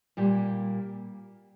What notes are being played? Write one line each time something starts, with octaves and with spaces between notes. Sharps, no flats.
A#2 G3 A#3